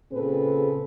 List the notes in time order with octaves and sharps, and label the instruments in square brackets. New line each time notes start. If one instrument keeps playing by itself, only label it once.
[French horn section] A#2 C#3 C4 G#4 A4 B4